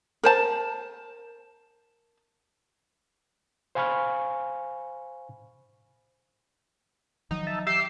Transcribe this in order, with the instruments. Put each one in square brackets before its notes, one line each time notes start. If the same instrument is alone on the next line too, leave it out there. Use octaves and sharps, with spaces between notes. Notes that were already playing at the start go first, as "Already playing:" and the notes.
[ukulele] A#4 C5 A5
[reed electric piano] C5 F5 G#5 B5 C#6 F6
[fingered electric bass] D#3 F3 F#3 [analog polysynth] D#4
[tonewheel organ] E5 A5
[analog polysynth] G4 [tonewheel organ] E5 E6 [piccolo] C7